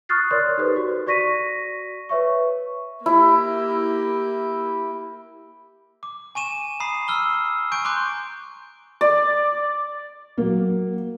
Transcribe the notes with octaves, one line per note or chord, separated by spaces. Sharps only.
C#6 D#6 F6 F#6 A6 C7
A#4 C#5 D5 C6 F#6
D#4 G4 A4 B4 C5
F#4
F#4 D5 C#6 A#6 B6 D#7
B4 C#5 E5 C#6
A#3 E4 G4
D6
G#5 C#6 D#7 E7
A#5 B5 D#6 C7
E6 F6 G7
G#5 C#6 G6 D7
A#5 C6 D6 F#6 G6
D5
F#3 A#3